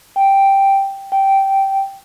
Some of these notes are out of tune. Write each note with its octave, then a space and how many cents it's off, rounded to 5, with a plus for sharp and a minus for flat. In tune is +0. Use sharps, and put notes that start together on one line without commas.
G5 +0
G5 -10